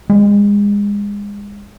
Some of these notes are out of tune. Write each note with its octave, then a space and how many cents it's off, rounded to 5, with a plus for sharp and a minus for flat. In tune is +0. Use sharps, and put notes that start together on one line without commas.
G#3 -30